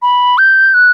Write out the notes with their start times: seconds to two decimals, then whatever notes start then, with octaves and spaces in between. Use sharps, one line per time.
0.02 B5
0.38 G6
0.74 F#6